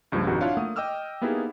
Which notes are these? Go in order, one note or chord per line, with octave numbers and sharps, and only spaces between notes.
C#2 G2 F3 A3
A#1 G2 C3 D#3 F#4 F#5
D4 E4 F4 C#5 F5 F#5
A3 A#3 D#6
D#5 G5 D6 E6 F6
A#3 B3 D#4 E4 G4 G#4